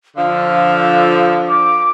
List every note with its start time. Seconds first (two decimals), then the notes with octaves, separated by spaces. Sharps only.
0.16 D3 F3 F5
1.49 D6